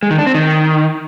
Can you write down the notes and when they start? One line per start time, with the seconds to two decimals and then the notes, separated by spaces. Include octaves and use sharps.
0.03 G#3
0.11 D#3
0.18 D4
0.26 C4
0.34 D#3